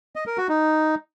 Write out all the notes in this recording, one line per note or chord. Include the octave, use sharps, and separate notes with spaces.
D#5
A#4
F#4
D#4